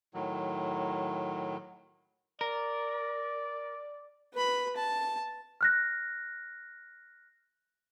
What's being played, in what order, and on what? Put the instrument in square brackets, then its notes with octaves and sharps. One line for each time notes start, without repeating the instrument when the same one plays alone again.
[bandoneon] A2 D#3 F#3
[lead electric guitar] A#4 [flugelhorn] D5
[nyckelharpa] B4 B5
A5
[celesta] F6 F#6 A#6